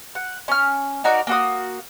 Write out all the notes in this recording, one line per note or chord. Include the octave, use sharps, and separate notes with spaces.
F#5
C#4 F6
D#4 F#4 A#4 D5
A#3 F#4 D#6